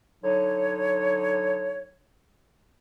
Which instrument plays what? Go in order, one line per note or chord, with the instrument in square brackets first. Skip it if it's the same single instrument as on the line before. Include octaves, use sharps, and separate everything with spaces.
[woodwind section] D3 F#3 D#4 C#5